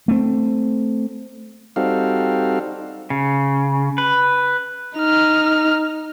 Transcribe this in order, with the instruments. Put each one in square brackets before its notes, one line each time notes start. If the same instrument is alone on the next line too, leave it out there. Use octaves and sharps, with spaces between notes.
[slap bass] A3 C4
[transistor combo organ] G3 C4 D#4 F#4 A4 F5
[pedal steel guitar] C#3
B4
[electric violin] D#4 F6